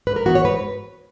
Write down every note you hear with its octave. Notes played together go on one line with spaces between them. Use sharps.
G#2 B4
A#4
E3 B3 F#4
C#5
G#2 B4